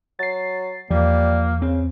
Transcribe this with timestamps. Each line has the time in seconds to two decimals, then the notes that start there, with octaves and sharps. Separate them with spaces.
0.19 F#3 A6 C7
0.91 E2 F3 G3 A#3
1.62 C#3 C4